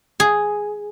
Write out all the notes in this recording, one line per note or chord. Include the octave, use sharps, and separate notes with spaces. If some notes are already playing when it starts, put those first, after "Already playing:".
G#4